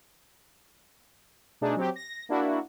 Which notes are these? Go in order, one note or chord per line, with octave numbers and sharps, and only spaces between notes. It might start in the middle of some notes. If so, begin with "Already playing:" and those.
B2 A3 D4 D#4 G#4
F#3 C4 G4
A#6
A#3 D4 E4 F#4